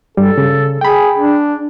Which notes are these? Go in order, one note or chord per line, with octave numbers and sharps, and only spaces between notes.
G2 G3 A4
C#3
G#4 G5 B5
D4